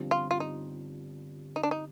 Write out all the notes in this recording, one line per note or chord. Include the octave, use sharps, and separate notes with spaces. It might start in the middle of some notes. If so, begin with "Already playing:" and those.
Already playing: G1 G2 F3 C4
F4
F4
D#4
D#4
D4
D#4